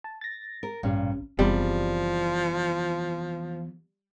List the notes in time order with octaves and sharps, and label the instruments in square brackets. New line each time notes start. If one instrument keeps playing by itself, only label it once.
[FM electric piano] A5
A6 A#6
[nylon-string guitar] A#4
[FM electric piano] A1 C#4 [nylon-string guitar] G2 A#2
[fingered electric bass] F#1 [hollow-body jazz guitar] E2 C3 [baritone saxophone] F3 [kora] G3